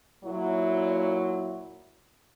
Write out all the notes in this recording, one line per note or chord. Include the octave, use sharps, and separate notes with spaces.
A#2 F#3 E4